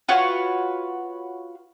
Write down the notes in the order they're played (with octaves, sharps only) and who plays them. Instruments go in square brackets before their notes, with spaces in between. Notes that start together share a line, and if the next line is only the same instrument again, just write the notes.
[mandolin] F4 F#4 B4 C#5